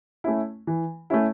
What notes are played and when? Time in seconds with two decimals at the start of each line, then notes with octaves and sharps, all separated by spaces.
0.24 A3 C#4 E4
0.67 E3
1.10 A3 C#4 E4